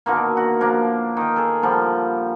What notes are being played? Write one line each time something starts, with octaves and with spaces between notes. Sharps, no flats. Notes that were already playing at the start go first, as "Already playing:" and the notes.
B2 D3 D#3 A#3
F#4
F3 A#3 D4
D#3 G5
G#4 A4
A#2 D3 F3 G3